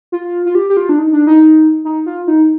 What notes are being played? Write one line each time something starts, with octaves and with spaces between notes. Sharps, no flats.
F4
F4
G4
G4
F4
D4
D#4
D4
D#4
D#4
F4
D#4